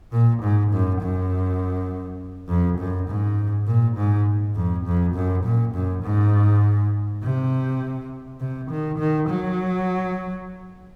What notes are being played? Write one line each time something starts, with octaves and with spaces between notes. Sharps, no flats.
A#2
G#2
F#2
F#2
F2
F#2
G#2
A#2
G#2
F2
F2
F#2
A#2
F#2
G#2
C3
C3
D#3
D#3
F#3